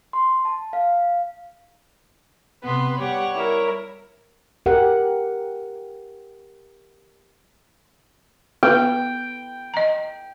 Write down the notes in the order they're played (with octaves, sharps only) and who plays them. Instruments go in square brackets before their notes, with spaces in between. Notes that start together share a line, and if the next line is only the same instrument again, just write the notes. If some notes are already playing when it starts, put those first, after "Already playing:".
[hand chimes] C6
A5
F5
[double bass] C3 [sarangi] B3 [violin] B4 C6
[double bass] G3 [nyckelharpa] G4 [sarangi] C#5 [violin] F#5
[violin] E4 [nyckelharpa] A#4
[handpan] G4 A#4 F#5
[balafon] B3 B4 [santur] G5
[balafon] D#5 A#5